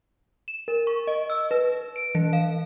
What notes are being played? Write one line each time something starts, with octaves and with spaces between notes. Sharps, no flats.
E7
A#4
C#6
D#5
E6
B4
D7
E3
F5